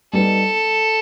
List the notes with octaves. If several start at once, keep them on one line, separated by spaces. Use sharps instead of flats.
G3 B3 D#4 A4